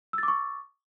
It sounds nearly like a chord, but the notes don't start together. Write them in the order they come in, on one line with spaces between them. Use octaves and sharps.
E6 A6 D6 C#6